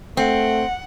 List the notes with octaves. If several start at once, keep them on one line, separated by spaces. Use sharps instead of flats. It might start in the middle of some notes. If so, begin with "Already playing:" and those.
A3 C4 F#5